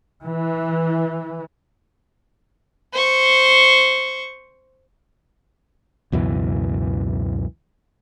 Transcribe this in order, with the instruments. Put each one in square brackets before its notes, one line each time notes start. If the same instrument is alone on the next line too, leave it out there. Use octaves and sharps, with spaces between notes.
[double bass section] E3
[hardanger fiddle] C5 C#6
[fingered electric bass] C#2 F#2 B2 E3